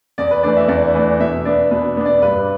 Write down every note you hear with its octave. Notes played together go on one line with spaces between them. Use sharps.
E2 D5
B4
E3 A3 D4 D5
E5
E2 D5
E3 A3 D4 B4
B2 E5
B3 D4 D5
B2 B4
B3 D4
D5
G2 B4